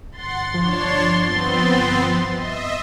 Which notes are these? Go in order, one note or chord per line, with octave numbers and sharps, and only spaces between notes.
G1 F#5 C6 A6
F3 D4 C#5
B3 C4
D#5 E5